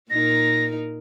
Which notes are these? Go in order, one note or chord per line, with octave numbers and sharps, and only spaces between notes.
A#2 D#4 A#4 A#6